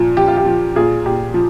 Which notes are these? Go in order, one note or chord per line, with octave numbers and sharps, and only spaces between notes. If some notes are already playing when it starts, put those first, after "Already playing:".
Already playing: A#2 F3
F3 G4
F4
G4
F3
A#2 F4 G#4
A#2 G4
F3